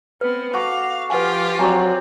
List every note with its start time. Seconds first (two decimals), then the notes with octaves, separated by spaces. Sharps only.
0.21 B3 C4 B4
0.53 F#4 A4 F5 D6
1.10 F3 F4 G4 B4 F#5 G#5
1.59 F#3 C4 D5 G#5 A#5 C#6